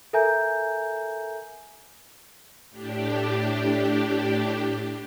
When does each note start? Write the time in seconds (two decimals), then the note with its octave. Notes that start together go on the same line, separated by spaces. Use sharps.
0.13 A4 A#4 E5 G#5 A#5 G6
2.71 A2 D4 G4